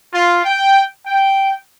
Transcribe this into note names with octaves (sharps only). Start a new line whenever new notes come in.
F4
G5
G5